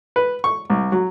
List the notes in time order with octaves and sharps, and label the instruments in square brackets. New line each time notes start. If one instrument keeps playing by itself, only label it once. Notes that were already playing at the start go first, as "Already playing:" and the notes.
[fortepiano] B4
C#6
C2
F#3